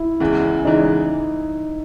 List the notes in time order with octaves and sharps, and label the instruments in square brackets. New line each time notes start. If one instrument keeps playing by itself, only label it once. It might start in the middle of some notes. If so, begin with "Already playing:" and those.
Already playing: [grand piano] E4
[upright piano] E2 C#3 E3 G#3
[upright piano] E2 C#3 E3 G#3 [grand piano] D#4